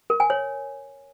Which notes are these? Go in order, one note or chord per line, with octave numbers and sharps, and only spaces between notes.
A#4
G#5
C#5